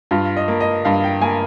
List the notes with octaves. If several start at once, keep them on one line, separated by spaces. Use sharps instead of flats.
G2 F4
D#5
A#3
D#5
G2 F5
G5
A#3 G#5